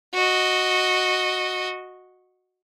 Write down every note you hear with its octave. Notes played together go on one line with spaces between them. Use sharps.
F#4 D#5